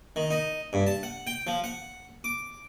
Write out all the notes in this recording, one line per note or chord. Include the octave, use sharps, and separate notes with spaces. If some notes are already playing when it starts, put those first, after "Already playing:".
D#3
D#4
G2
A5
F#5
G5
F3
F#5
D6